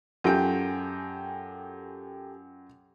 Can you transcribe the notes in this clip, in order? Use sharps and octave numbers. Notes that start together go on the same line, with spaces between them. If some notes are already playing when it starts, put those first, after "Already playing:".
F#2 F4 G4 A4 G5 G#5